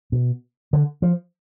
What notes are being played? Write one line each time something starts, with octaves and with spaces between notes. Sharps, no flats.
B2
D3
F3